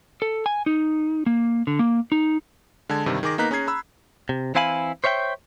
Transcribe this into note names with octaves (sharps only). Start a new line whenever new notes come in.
A4
G#5
D#4
A#3
D3
A#3
D#4
D3 G#3 A5 G#6
G2 C3 D#3 G3
D#3 G#4 D6 A#6
A#3 B3 D#4 A#5 F#6 B6
C#4 G#4 A#5 G#6 C7
A#5 B5 E6
C3
E3 C4 E4 F5 G#5 B5
C5 C#5 E5 F5 G5